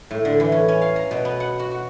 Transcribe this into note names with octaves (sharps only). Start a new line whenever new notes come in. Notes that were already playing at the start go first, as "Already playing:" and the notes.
A2
D3
E3
C#4
C#4
F5
A#5
B2
B3
F#5
F#4
F#4